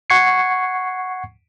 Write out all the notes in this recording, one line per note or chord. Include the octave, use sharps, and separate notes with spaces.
F#5 C#6 G#6 C7 C#7